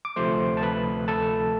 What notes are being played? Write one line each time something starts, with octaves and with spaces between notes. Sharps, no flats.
D6
D2 C3 F3 A3 C5 C6
A5
B4 B5
A4 A5